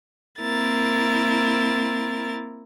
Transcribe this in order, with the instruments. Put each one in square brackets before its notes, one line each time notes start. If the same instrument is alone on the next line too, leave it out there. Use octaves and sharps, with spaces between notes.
[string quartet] A#3 C4 E4 A#4 A6